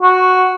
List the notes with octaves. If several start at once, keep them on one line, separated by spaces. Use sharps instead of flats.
F#4